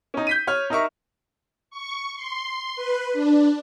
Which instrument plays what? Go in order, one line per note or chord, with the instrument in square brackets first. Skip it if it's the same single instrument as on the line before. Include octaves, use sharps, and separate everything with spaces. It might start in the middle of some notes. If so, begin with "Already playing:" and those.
[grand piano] C#4 D#4
G6 B6 D#7
C#5 F6
D#4 A#4 E5 C#6
[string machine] C#6
C6
B4
D4